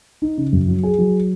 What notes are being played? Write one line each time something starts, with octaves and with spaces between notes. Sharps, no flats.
D#4
C#3
F#2
F#3
G#4
F#3